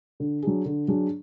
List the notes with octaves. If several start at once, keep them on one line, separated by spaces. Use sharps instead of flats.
D3
F#3 D4 G#4
D3
F#3 D4 G#4